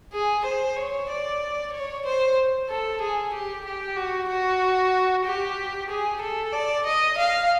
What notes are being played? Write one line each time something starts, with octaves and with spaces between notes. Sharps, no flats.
G#4
C5
C#5
D5
C#5
C5
A4
G#4
G4
G4
F#4
F#4
G4
G#4
A4
D5
D#5
F5